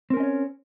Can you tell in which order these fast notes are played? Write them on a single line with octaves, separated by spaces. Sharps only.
C4 A#4 C#4 D#5 C#5